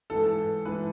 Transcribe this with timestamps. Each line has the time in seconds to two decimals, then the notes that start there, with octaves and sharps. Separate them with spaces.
0.10 G#2 E3 A4
0.65 G#2 E3 B4